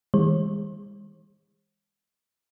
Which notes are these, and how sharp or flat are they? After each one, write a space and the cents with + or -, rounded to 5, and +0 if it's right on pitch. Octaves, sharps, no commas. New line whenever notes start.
E3 -40 G#3 -45 C5 +45